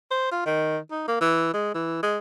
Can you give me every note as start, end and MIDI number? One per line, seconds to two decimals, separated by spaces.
0.11 0.31 72
0.32 0.43 65
0.46 0.78 51
0.91 1.07 63
1.08 1.17 58
1.21 1.50 52
1.53 1.74 56
1.74 2.03 52
2.03 2.18 56